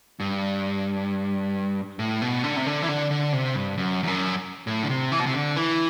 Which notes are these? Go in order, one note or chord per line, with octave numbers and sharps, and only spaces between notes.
G2
A2
B2
D3
C3
D3
E3
D3
D3
C3
G2
F#2
E2
F#2
A2
D3
C3
E3
B2
C3
D3
E3